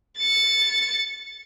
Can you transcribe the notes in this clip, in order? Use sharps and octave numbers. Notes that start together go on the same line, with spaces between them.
A6 C#7